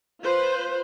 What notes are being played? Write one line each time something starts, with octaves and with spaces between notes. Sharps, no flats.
F4 B4 C5